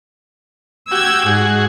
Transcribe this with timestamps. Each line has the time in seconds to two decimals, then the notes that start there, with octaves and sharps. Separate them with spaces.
0.92 F#4 G4 E6 G#6
1.26 G#2 F#4 G#4